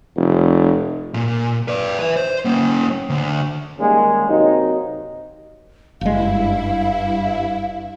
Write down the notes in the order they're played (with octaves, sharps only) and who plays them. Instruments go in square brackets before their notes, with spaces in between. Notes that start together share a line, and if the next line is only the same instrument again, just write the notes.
[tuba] F1
[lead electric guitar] A#2
B4 D5
B4 E5
C5
A#3 C#4
D2
[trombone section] D#2 D#3 G3 G#3 A#3 C#4
C3 F#3 A#3 C4 D#4
[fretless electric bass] F#1 G#3 [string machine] G2 E4 [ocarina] F5